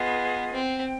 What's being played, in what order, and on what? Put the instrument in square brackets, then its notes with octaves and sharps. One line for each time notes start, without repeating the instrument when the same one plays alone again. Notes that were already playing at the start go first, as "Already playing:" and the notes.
Already playing: [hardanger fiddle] B3 [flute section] F4 G#4 B4 D#5
[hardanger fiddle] C4
[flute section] G5